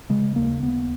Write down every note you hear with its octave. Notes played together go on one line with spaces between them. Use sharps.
C#3 G#3
D#2 A#3
D#2 B3